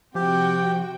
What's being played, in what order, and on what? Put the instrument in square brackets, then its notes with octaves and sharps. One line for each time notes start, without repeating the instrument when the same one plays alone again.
[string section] C3 F#4 G5 [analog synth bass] F3 [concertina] G4